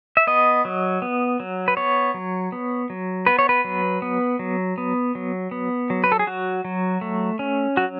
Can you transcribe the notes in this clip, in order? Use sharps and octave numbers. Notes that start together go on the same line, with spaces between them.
E5
B3 D#5
F#3
B3
F#3
B4
B3 C#5
F#3
B3
F#3
B3 B4
C#5
B4
F#3
B3
F#3
B3
F#3
B3
F#3
B4
A4
G#4
F#3 F#4
F#3
A3
C#4
F#3 F#4